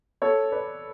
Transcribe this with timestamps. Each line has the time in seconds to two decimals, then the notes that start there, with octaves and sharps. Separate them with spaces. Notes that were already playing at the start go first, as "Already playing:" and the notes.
0.22 A4 C#5
0.52 B4 D5